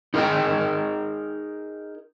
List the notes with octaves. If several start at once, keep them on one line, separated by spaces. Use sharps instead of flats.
D#4 G#4 A#4 C#5 D#5 G5